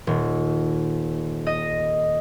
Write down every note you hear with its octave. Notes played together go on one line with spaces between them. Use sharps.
D#1
D#5